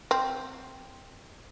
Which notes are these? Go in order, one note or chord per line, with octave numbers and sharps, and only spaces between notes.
C4